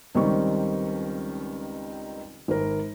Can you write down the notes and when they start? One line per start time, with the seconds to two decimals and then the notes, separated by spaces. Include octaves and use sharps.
0.15 C#2 D#3 G3 C4 C#6
2.48 G#1 A#4